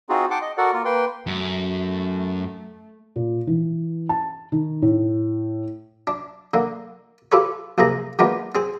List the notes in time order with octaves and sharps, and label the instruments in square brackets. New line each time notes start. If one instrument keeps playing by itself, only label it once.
[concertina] C4 D#4 F4 F#4 G#4
F#5 G5 A5 C6 D6
D#5
F#4 A4 A#4 D5 F#5
A#3 F4 A#4
A#3 B4 G5 C6
[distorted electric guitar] F#2 [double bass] A3
[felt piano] A#2
E3
A5
D#3
A2
[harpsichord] D4
D3 A#3
F4 G4 A4 B4 C#5
A#1 C3 A#3 G#4 A#5
D#3 G#3 A#3 B3 D4 F4
C4 G#4 C5